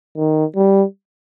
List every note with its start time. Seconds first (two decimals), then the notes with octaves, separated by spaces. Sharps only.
0.17 D#3
0.56 G3